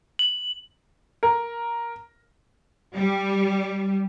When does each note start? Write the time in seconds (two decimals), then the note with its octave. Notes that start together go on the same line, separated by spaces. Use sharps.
0.19 F#7
1.23 A#4
2.93 G3